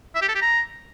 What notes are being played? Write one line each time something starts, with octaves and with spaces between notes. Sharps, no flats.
E5
G4
A4
G4
A#5